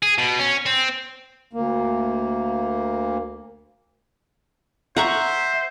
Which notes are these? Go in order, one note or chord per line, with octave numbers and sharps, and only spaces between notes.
G#4
B2
C#4
C4
D2 A#3
C5 E5 F#5 A#5 C#6